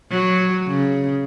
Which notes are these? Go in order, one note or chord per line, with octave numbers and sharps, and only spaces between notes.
F#3
C#3